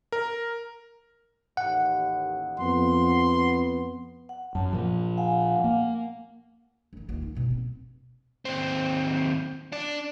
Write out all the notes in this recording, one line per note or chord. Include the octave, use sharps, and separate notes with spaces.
A#4
A1 D#2 F#5
F2 B3 C6
F#5
F#2 A5
A#2 F3
F5 F#5 G#5
A#3
D2 D#3
D#2 F4
D#4
G2 B2
C4
D#2 C4
D4 D5